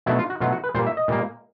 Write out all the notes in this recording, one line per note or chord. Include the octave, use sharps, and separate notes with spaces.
B2 F#3 A3 E4
F4
F#4
B2 F#3 A3 F4
F#4
B4
A#2 G3 A#3 C5
E5
D#5
A#2 G3 A#3